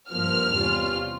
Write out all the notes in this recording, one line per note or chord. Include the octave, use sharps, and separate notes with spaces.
G2 F3 A#3 F6
E2 C3 G3 C#4 F4